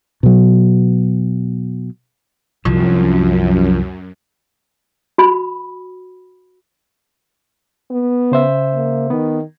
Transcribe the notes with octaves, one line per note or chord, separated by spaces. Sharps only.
B2 F#3
C2 F#2 F3
F#4 B5
B3
C#3 C5 E5
A#3
D#3 B3